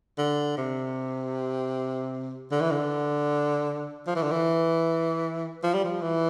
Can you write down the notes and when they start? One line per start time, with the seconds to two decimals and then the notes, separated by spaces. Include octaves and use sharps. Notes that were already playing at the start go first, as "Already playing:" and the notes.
0.18 D3
0.57 C3
2.51 D3
2.61 E3
2.71 D3
4.07 F3
4.16 E3
4.23 D3
4.32 E3
5.63 F3
5.74 G3
5.84 F3
6.02 E3